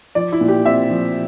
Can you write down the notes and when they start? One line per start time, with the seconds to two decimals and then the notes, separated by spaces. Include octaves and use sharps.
0.15 F3 D5
0.32 E4
0.41 A#2
0.48 G4
0.65 C4 E5
0.90 F3